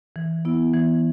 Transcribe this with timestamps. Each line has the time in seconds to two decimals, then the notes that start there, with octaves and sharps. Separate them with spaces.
0.16 E3
0.45 B3 E4
0.73 E3